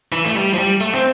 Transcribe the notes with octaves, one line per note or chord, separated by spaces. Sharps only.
E3
A3
G3
F3
G3
A3
C4